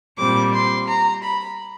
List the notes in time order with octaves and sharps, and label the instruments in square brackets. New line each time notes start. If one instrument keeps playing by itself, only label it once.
[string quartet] A#2 G3 C4 D6
C6
A#5
B5